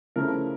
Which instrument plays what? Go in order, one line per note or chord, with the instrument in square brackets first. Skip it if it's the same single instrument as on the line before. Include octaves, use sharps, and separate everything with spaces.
[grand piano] C#3 F3 A3 C#4 E4 A#4